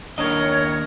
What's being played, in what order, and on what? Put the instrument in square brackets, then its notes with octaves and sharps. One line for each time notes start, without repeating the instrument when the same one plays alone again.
[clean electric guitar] D#2 D4 D#5 [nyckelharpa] A#4 A#5 [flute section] C#5